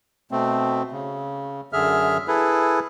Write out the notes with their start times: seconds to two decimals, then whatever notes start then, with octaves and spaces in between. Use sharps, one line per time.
0.31 B2 A3 C4
0.92 C#3
1.73 F#2 D3 G#4 E5 F6
2.28 E4 G#4 A4 B4